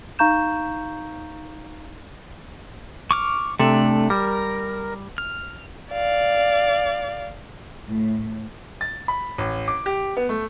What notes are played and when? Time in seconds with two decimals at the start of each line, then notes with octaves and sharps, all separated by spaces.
0.19 D#4 F5 A#5 C#6 G6 E7
3.11 C#6 D6 F6
3.59 C3 A3 D4 A4
4.10 G3 A#4
5.18 F6
5.92 D5 F5
7.87 A2
8.81 A6
9.08 B5
9.38 A1
9.68 D6
9.86 G4
10.17 B3
10.29 A3